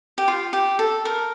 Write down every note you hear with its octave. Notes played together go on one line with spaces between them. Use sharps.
G4
F4
G4
A4
A#4